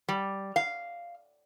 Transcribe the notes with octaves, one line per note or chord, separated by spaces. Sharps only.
G3
F5